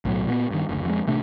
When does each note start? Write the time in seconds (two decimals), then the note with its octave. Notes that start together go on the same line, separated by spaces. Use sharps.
0.05 B1 A2 F#3
0.26 A#2 G#3 B3
0.50 G2 D#3
0.69 F#1 D2
0.85 F2 G#3
1.07 A1 C3 A3 D4